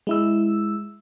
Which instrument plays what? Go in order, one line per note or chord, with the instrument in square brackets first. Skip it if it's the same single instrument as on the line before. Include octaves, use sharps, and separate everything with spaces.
[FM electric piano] G#3 E4 E6